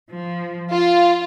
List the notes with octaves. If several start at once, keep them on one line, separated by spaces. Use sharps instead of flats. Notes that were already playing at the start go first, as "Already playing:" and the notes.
F3
F4